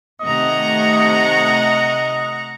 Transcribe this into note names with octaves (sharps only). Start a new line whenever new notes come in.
C3 D#3 A3 D#5 F#5 A#5 C#6